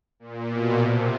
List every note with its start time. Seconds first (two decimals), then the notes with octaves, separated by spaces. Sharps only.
0.20 A#2
0.49 B2
0.78 C3